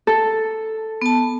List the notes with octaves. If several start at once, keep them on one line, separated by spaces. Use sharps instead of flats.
A4
B3 A5